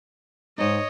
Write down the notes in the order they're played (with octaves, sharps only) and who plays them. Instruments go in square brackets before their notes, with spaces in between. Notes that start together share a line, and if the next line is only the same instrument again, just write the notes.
[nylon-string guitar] G#2 D#4 [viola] C#5 D#5